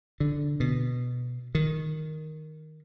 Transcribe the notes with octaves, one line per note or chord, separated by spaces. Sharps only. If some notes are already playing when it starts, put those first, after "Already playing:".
D3
B2
D#3